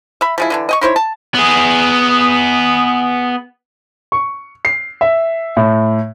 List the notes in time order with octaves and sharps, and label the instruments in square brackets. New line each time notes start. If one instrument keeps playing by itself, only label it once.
[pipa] E5 B5
F3 G#3 E4
D3 E3 D4
D#5 G5 C#6
D#4 E4 C5 C#5
A5
[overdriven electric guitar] B3 G#4
[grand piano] C#6
C7
E5
A2